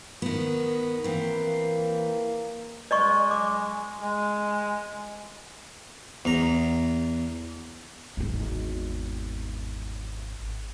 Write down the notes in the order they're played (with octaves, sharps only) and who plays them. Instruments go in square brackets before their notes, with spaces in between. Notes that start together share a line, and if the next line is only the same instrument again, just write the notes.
[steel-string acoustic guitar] D#3 B3
[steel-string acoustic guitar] E3 C4 [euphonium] A#3
[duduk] G#3 [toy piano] D5 D#5 C#6
[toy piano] D6
[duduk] G#3
[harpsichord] E2 A#5
[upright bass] G#1 E2